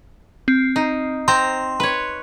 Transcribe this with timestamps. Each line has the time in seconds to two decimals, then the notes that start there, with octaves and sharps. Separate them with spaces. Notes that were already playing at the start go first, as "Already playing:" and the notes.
0.48 C4
0.76 D#4
1.28 C4 C5 A#5 C6
1.80 B4 C#5